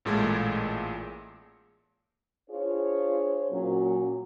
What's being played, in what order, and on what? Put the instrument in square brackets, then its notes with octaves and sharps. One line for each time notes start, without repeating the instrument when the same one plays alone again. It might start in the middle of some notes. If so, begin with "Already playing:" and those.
[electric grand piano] A1 A#2 G#3 A3 G#6
[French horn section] D4 F4 G#4 C5 C#5
A#2 F#3 C#4